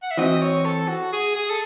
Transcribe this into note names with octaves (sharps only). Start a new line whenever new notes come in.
F#5
E5
E3 C4 F#4 D#5
C#5
A4
F#4
G#4
G#4
A4